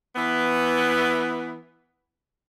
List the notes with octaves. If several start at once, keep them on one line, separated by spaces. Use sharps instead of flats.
E3 B3